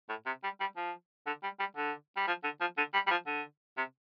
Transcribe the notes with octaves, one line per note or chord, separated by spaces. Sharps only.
A2
C3
G3
G3
F3
D3
G3
G3
D3
G3
F3
D3
F3
D3
G3
G3
F3
D3
C3